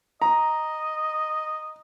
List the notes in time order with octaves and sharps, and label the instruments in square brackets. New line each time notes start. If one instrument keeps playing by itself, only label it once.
[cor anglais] D#5 [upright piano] A#5